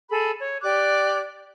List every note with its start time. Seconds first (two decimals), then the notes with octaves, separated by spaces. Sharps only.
0.09 G#4 A4 B5
0.39 C#5
0.62 G4 D5 D6 F#6